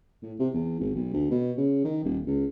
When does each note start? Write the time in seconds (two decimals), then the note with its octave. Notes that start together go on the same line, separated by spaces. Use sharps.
0.23 A2
0.39 C3
0.54 E2
0.79 G#1
0.95 B1
1.13 D2
1.30 B2
1.57 C#3
1.84 D#3
2.04 D#1
2.26 C#2